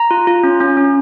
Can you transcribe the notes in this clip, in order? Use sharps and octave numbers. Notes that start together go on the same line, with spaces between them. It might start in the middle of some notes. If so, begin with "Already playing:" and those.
Already playing: A#5
F4
F4
C#4
C#4
C#4